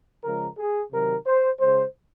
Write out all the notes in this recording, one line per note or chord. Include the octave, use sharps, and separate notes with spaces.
C#3 F3 G#3 A#4
G#4
C3 D#3 F#3 A#4
C5
C#3 G#3 C5